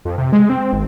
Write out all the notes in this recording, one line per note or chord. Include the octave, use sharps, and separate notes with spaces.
F2
C3
G#3
C4
G#1